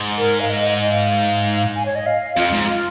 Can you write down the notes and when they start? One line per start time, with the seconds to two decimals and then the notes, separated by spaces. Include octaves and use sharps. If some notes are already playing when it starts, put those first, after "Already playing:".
Already playing: G#2
0.18 A#4
0.40 F5
0.49 D#5
0.70 D#5
0.91 F5
1.75 G#5
1.86 C#5
1.95 D#5
2.06 F5
2.37 F2 F4
2.53 G#2
2.69 F4